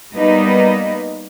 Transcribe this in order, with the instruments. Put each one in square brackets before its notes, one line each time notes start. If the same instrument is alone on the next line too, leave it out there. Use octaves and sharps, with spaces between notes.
[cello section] G3 A#3 B3 D#4 B4 D#5